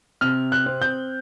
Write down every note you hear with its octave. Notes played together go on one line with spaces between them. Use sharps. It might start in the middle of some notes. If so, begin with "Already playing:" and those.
C3 F6
F#6
C4
G6